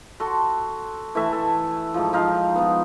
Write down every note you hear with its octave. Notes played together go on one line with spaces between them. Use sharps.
F#4 A4 C6
E3 A3 E5
A4
G#2 F3
F3 D#4 F5
F3 B3